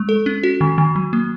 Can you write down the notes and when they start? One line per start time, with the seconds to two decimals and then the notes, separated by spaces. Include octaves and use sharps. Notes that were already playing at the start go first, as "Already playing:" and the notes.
Already playing: G#3
0.09 A4
0.26 C#4
0.43 F#4
0.61 D#3
0.78 D#3
0.96 F#3
1.13 A#3